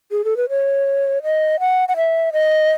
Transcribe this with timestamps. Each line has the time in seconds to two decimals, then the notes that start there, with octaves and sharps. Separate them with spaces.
0.11 G#4
0.25 A4
0.37 B4
0.49 C#5
1.23 D#5
1.60 F#5
1.88 F#5
1.97 E5
2.33 D#5